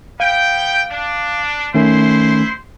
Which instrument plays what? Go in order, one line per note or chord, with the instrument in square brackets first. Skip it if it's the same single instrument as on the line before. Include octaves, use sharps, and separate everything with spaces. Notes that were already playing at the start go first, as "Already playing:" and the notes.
[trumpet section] B3 G5 [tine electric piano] F5
[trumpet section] D4
[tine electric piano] D#3 A3 C#4 [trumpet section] E4 C5 C6